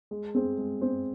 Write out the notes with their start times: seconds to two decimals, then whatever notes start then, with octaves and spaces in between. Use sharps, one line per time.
0.11 G#3
0.35 C4 G#4 C5
0.58 G#3
0.81 C4 G#4 C5